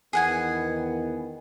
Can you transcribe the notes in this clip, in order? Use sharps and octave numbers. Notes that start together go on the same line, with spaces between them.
E2 D#3 B3 G#4 F#5 G#5